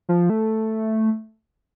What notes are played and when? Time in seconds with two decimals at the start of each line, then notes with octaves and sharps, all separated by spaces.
0.09 F3
0.30 A3